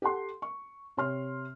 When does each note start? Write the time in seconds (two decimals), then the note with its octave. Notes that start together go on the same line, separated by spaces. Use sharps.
0.02 G4 A4 F#5 C6
0.42 C#6
0.97 C3 C#5 C6 F6